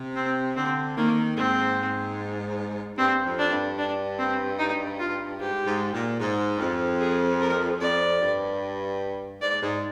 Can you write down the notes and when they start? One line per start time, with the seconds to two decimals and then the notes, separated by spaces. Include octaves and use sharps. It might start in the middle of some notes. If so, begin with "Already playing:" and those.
Already playing: C3
0.16 C4
0.56 D3 C4
0.97 D#3 A#3
1.36 G#2 C4
2.97 G2 C4
3.24 F2
3.38 D4
3.51 G2
3.78 D4
4.18 C4
4.59 D#4
4.99 F4
5.39 G#2 G4
5.66 G#2
5.93 A#2
6.20 G#2
6.56 G2
6.60 F2
7.00 G#4
7.40 A#4
7.81 F2 D5
8.21 G2
9.41 G#2 D5
9.62 G#2